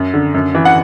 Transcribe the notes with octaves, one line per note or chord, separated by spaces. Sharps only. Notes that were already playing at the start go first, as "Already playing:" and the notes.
Already playing: F#2
D3
F#2
E3
F#5